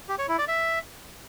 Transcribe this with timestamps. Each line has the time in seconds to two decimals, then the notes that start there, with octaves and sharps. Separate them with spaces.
0.09 G4
0.19 C#5
0.28 E4
0.38 D5
0.48 E5